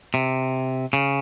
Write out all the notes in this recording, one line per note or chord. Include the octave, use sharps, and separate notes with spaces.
C3
C#3